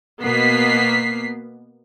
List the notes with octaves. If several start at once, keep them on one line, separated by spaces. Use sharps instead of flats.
B2 A#3 B3 B6 C7